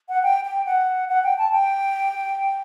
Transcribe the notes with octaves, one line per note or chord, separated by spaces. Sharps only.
F#5
G5
G5
F#5
F#5
G5
A5
G5